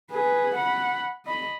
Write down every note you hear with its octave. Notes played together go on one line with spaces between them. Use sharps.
G#4 B4
F#5 B5
D#5 B5